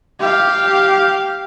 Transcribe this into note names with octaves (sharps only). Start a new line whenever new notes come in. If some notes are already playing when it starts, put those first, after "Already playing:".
G4 F5